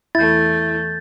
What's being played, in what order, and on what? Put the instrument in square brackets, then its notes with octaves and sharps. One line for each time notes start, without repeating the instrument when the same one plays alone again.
[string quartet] E2 A3 [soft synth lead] E4 [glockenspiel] G6 A6